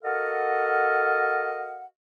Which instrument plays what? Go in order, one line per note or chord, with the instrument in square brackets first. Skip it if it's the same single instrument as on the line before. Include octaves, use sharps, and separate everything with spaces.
[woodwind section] F#4 A4 A#4 D#5 F5 F#5